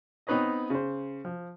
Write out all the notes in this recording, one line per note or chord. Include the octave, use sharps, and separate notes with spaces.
B3 C4 D#4 B4 C#5 D#5
C#3 C5
F3